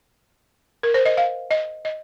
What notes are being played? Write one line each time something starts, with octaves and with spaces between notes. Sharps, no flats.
A#4
C5
D#5
F5
D#5
D#5